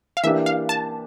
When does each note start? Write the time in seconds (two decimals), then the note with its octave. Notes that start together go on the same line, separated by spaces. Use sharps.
0.17 F5
0.23 E3 A#3 D4 G4 E5
0.46 F5
0.69 A5